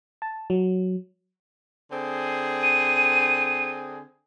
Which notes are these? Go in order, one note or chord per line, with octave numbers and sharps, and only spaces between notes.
A5
F#3
D3 C4 G#4
D#7